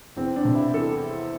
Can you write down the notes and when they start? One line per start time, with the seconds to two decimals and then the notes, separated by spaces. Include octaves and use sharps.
0.17 E2 C4
0.36 D4
0.45 C3
0.55 E4
0.74 E2 A4